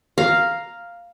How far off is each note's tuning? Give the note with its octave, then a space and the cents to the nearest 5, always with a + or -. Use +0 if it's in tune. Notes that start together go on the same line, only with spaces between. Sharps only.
F5 +0 A#5 +0